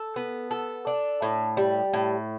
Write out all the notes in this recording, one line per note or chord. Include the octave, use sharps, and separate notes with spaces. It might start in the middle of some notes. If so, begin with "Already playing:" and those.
Already playing: A4
B3
A4
D4
A2
G3
A2